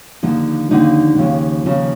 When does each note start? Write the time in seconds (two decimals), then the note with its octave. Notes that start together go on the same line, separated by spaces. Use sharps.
0.23 D#2 D3 F3 A#3 D#4
0.70 D#2 D3 F3 A#3 D#4
1.18 D#2 C#3 F3
1.66 D#2 C#3 F3